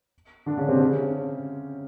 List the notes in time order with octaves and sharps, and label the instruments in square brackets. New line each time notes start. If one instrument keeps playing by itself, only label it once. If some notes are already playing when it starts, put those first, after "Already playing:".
[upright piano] D3 D4
C#3 C#4
C3 C4
D4
C#3 C#4